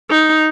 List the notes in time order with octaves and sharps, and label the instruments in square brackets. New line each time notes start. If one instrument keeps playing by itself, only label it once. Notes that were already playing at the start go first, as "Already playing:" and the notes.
[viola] D#4